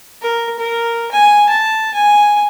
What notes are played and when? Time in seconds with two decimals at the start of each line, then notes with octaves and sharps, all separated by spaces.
0.21 A#4
0.59 A#4
1.12 G#5
1.49 A5
1.94 G#5